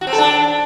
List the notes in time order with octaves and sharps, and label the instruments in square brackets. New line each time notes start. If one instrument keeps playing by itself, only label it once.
[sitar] F#4
C4
A4
D4